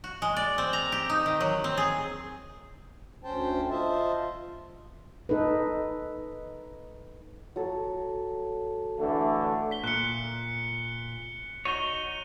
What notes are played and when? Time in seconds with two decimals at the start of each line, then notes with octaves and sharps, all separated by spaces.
0.04 F#4
0.22 G#3
0.36 D5
0.58 C4
0.73 A#5
0.92 G4
1.10 D#4
1.26 D#3
1.41 F#3
1.64 C4
1.77 G#4
3.24 D2 C#4 C5 G5 A5
3.70 F4 C5 D#5 E5 A5
5.29 D#4 A4 B4
7.56 F#3 A4
8.99 D3 E3 A3
9.71 B6 G7
9.84 A#2 F#6 C#7
11.65 D#4 F#4 C#5 D#7 F7 G7